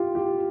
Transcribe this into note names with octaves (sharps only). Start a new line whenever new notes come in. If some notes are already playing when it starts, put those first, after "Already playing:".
Already playing: F4 G4
G4